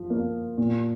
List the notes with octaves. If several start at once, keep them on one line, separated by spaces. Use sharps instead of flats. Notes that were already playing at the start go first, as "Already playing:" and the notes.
Already playing: F3
A#3
A#2